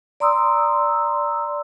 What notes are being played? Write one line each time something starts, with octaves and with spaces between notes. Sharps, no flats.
D5 A#5 C6 D#6 E6